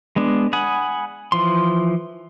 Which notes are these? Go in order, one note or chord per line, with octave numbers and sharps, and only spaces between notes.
G#3 B3 D4
F#5 G#5 B5 D#6
E3 F3 C6